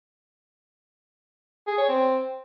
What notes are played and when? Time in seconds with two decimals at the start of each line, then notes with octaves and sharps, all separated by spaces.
1.67 G#4
1.78 C#5
1.89 C4